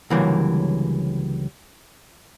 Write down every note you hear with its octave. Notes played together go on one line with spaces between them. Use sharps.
C#2 D3 E3 F#3 G3 A#3